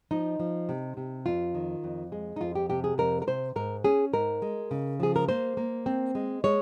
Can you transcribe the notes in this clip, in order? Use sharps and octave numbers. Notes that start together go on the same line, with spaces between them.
F3 D#4
F3
C3
C3
F2 F4
D#3
F2
G#3
D#4
F2 F4
G4
C3 G4
G#4
F2 A#4
A#4
C3 C5
G#2 A#4
C#4 G#4
G#2 A#4
G#3
C#3
F3 G#4
A#4
A#3 C5
A#3
C4
G#3
G#3 C#5